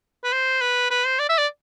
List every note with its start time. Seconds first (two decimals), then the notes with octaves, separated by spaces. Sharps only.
0.24 B4
0.32 C5
0.61 B4
0.90 B4
1.05 C5
1.19 D5
1.29 E5
1.38 D5